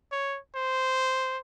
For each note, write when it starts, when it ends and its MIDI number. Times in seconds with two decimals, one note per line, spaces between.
0.12 0.38 73
0.55 1.38 72